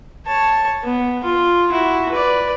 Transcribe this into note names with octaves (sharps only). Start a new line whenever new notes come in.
C#5 A5
B3
F4
E4 F#4
B4 D5